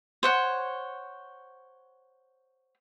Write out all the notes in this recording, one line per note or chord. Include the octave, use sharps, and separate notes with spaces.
C5 C#5 F#5